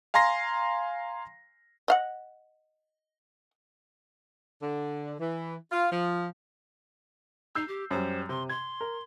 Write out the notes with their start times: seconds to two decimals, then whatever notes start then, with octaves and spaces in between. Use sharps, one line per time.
0.14 F5 G#5 A#5 C6 A#6 C7
1.88 D#5 F5 F#5
4.62 D3
5.20 E3
5.71 F4
5.91 F3
7.55 D#4 E6 G6 C7
7.68 G4
7.91 F#2 G3 C5
8.29 C3 C6
8.49 C6 G#6
8.81 A#4